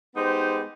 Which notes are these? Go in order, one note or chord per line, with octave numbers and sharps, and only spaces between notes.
G#3 B3 D#4 G4 C5